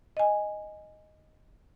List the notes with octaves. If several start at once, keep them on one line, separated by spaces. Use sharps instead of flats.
D#5 G#5